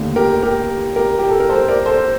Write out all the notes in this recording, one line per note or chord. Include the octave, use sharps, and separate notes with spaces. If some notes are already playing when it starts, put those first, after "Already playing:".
Already playing: D#2 D3 A3
G4 A#4
G4 A#4
G4 A#4
G4
A4
A#4
A4 C5
A#4 D5
A4 C5